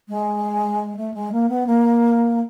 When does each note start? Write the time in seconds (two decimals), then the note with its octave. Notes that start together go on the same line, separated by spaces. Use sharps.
0.09 G#3
0.97 A3
1.14 G#3
1.32 A#3
1.49 B3
1.67 A#3